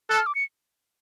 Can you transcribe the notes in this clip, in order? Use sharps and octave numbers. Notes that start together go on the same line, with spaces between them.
A4 F#6
F6
D6
C#7